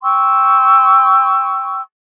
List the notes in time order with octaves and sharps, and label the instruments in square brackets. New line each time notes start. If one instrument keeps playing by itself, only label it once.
[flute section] G5 C6 C#6 E6